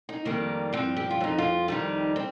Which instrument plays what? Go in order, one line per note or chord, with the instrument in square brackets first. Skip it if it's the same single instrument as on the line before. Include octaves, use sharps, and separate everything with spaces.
[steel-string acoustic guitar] D#4
F2 D#3 G3 A#3
G2 F3 C4
G4
F4
F2 F3 D#4
F4
F2 D#3 G3 D#4
C4